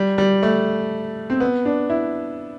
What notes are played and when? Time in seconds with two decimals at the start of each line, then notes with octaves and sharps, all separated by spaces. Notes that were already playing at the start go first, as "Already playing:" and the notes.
Already playing: G3
0.18 G3
0.43 A3
1.30 C4
1.40 B3
1.65 D4
1.90 E4